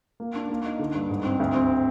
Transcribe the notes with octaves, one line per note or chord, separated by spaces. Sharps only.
A#3
D4
A#3
D#4
D3
G2
G#2
C4
D2
C4